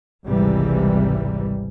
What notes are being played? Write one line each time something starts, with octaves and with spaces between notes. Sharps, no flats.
G#1 C#2 C3 E3 G3